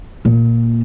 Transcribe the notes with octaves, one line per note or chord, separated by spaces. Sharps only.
A#2